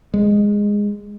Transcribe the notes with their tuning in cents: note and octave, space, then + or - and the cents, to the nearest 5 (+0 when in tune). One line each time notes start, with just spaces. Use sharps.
G#3 -10